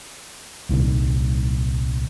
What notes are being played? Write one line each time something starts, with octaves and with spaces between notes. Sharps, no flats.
D#1 C2 D#3